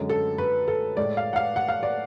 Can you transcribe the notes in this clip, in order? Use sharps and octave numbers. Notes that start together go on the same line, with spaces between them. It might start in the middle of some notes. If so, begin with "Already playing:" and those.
Already playing: F#2 D3 G#3
A4
B4
A4
A2 G#3 D5
F5
F#5
F5
F#5
F5
D5